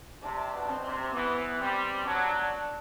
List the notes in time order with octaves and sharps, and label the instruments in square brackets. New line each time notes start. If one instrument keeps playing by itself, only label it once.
[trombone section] C3 [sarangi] D4
[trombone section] B2
[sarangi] C4
[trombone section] C3
[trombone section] E3 [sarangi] B3
[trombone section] G3 [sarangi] C4
[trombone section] F#3 [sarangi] D4